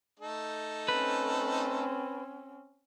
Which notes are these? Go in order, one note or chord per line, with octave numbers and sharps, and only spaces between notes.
A3 D#4 A4
C4 C#4 B4